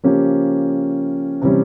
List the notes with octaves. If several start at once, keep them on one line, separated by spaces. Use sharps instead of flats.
C#3 F3 A#3 C#4 G4
C3 E3 G3 C#4